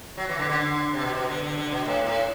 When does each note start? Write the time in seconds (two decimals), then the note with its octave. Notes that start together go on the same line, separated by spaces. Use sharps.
0.17 F#3
0.29 E3
0.39 D3
0.49 D3
0.93 C3
1.02 B2
1.15 B2
1.29 D3
1.43 D3
1.58 D3
1.72 B2
1.85 A2
2.07 A2